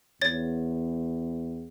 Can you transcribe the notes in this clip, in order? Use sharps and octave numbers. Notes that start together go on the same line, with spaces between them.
E2 C#5 A6